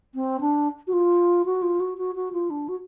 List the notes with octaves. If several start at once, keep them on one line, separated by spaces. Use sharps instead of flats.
C4
D4
F#4
F4
F#4
F4
F#4
F#4
F#4
F4
D4
F#4